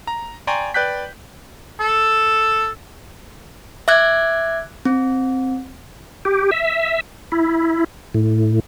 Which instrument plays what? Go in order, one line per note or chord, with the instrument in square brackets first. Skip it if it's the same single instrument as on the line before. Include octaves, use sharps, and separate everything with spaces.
[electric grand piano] A#5
D5 G5 G#5 A#5 C6 C#6
B4 D5 G5 F#6 G6 B6
[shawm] A4
[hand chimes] E5 D6 F#6 G#6
C4
[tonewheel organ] G4
E5
E4
A2